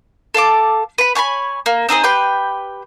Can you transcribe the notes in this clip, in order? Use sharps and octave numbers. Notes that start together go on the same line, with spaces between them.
A4 F5 A5 D6
B4 B5
C#5 G#5 A5 B5
A#3
C4 D#4 G#4 C5
G4 B4 G5 C6